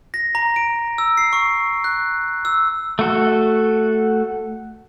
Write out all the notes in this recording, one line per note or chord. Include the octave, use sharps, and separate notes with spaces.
A#6
A#5
D7
E6
C7
C#6
F#6
E6
A3 F#4 A4